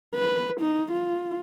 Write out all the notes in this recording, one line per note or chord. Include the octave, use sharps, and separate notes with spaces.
B4
D#4
F4